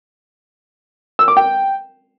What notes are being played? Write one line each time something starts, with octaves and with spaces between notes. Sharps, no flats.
E6
D6
G5